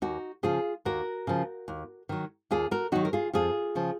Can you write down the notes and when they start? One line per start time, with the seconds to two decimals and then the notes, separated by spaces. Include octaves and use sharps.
0.02 D#2 D#4 F#4
0.43 C#3 F3 F4 G#4
0.85 D#2 F#4 A#4
1.27 C#3 F3
1.68 D#2
2.09 D#3 F#3
2.51 D#2 F4 G#4
2.71 F#4 A#4
2.92 D#3 F#3 D#4 F#4
3.05 A#4
3.13 F4 G#4
3.33 F2 F4 G#4
3.75 C#3 F3